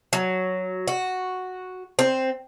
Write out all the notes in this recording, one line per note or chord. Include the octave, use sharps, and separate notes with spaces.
F#3
F#4
C4